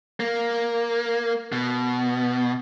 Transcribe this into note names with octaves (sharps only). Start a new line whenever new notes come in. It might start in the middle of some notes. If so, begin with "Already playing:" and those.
A#3
B2